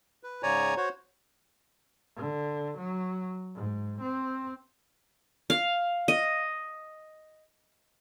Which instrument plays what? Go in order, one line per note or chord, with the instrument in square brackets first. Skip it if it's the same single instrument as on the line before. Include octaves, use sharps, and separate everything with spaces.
[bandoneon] B4
G#2 C#3 C#5 D5 G#5 A#5
F#4 C5 C#5
[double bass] D3
F#3
G#2
C4
[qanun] F5
D#5